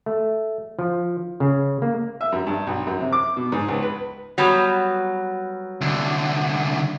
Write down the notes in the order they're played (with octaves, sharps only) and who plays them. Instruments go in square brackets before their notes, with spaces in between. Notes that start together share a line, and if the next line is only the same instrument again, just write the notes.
[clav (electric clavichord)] A3
F3
C#3
A#3
[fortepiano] E5
F#2
G2
B1
F#2
C3
D6
B2
G#2
C#2
B4
[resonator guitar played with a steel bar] F#3 G3 B3
[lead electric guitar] C2 D3